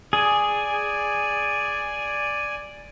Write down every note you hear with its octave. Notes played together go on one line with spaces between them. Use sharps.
G#4 D5 G#5